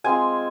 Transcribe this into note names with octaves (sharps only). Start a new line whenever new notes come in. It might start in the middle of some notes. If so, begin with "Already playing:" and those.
G#3 C4 F4 G#5